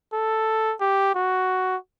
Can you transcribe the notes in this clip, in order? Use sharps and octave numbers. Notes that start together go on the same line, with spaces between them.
A4
G4
F#4